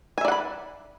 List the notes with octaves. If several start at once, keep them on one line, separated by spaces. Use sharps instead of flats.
D5 E5 F#5 G#5 B5